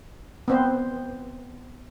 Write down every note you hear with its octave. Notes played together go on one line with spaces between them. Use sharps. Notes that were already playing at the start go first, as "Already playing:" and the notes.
B3 C4 C5